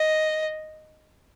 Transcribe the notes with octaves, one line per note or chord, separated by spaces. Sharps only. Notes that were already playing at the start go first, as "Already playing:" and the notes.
Already playing: D#5